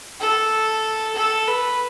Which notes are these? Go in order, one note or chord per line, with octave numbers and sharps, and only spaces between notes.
A4
A4
B4